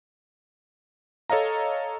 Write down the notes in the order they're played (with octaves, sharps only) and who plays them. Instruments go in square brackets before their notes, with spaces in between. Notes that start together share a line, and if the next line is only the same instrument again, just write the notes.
[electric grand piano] A4 C#5 D#5 F5 A#5